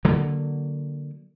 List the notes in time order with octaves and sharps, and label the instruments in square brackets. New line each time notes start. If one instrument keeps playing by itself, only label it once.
[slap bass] D3 F#3 A#3